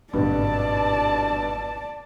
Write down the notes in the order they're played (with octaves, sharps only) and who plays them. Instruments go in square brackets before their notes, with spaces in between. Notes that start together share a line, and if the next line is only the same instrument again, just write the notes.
[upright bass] G#1 [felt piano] G2 B2 D3 [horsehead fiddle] D5 A5